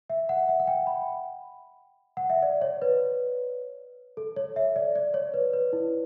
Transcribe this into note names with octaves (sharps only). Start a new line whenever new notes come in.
E5
F#5
E5
F#5
G5
B5
F#5
E5
D5
C#5
B4
A4
C#5
E5
D5
D5
C#5
B4
B4
E4